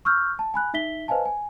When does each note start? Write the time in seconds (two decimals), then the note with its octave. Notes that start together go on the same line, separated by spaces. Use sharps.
0.05 C#6 E6 F6 G6
0.39 A5
0.54 G#5 B5 F#6
0.74 D#4 E5 B6 G7
1.08 B4 C5 D#5 F5 G#5 A5
1.25 G#5